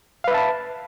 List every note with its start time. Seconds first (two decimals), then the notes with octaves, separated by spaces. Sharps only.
0.24 F5
0.28 B4
0.31 E5
0.34 A5
0.38 B5